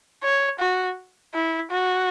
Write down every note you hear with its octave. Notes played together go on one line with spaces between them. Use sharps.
C#5
F#4
E4
F#4